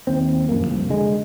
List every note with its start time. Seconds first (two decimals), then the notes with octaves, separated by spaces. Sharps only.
0.07 D#2 C4
0.49 A#1 F#2 A#3
0.67 F1 C2
0.90 D3 G#3